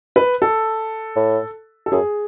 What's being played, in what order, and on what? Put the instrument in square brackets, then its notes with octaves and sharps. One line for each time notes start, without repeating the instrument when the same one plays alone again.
[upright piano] B4
A4
[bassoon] A2
[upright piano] A4
[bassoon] F#2 [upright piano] G#4